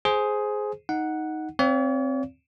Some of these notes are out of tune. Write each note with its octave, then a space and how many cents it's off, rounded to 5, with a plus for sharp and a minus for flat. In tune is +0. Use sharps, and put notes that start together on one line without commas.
G#4 +10 C5 +0
D#4 +5 F#5 +0
C4 +5 C#5 +45 F5 +5